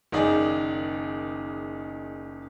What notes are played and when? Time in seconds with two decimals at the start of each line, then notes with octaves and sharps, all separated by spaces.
0.12 F#1 D#3 D#4 G#4 D5